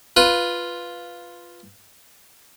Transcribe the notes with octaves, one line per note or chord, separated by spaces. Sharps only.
F4 B4